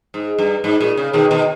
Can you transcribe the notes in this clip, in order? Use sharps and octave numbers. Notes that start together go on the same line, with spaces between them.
G#2
G2
G#2
A#2
C#3
B2 D#3
B2 D#3